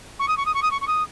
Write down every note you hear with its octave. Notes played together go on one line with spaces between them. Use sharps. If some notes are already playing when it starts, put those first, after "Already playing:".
C#6
D#6
C#6
D#6
C#6
D#6
C#6
C#6
D#6